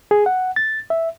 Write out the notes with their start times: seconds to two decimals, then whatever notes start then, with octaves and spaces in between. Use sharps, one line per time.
0.11 G#4
0.26 F#5
0.56 A6
0.90 E5